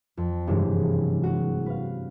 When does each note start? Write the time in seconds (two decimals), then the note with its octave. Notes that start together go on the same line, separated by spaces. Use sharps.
0.17 F2
0.47 F#1 G2 C3 E3 G#3
1.23 F#4
1.66 B4 F5